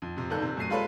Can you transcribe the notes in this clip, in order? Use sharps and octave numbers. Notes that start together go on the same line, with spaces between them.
F2
F2 C3
G1 D#3 A4 F#6 G6
C3
F#2 A3 C7 D#7
G3 G#3 F4 A4 B4 C#5